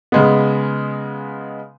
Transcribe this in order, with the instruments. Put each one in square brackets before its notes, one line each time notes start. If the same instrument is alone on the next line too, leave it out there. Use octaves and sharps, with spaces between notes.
[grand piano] C#3 G#3 B3